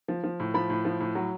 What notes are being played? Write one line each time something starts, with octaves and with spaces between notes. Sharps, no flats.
F3
F3
A2
F3 B5
A2
F3
A2
F#3